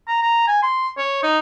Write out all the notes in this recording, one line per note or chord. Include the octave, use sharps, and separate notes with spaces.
A#5
A#5
G#5
C6
C#5
D#4